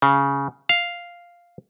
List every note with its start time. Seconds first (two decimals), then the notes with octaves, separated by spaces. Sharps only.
0.02 C#3
0.69 F5